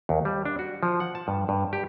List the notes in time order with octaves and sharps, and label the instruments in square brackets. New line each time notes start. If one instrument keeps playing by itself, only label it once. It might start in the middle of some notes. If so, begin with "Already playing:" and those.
[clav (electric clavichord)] D#2
G3
D4
F#4
F3
F#5
A5
G2
G2
G4